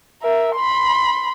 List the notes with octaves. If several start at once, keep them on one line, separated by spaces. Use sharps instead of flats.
A#4 E5
B5 C6